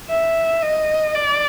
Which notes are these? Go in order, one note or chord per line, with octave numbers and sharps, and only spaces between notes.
E5
D#5
D5